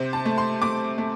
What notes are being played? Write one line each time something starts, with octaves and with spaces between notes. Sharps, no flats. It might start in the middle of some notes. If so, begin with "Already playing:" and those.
Already playing: C3 C5
A5
A3
C6
A3 D6
A3